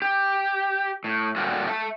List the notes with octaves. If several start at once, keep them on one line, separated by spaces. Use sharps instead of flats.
G4
A2
A#2 D3 G3 F4 F#4
E5 A5